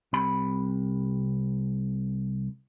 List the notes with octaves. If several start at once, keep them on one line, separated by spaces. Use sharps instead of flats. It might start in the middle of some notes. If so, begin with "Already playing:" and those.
C2 C3 B5